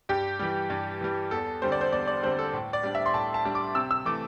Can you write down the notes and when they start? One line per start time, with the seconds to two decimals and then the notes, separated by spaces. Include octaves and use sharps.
0.09 G2 G4
0.39 E3 G3
0.70 G2
1.01 E3 G3
1.31 E2 A4
1.62 D3 G3 C4 C5
1.72 D5
1.81 C5
1.92 E2 D5
2.07 D5
2.23 D3 G3 C4 C5
2.39 A4
2.53 A2
2.73 D5
2.83 G3 D4
2.95 E5
3.06 C6
3.14 A2 A5
3.34 A5
3.45 G3 D4
3.55 D6
3.75 C3 E6
3.91 E6
4.05 E3 A3 D6